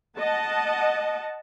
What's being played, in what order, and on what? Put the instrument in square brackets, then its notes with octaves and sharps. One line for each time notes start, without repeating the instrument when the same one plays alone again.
[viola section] D#5 F#5 A5